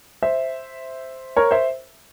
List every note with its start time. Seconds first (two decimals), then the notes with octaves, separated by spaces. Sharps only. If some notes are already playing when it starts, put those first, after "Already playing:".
0.22 C5 E5
1.37 A#4 C#5
1.51 C5 E5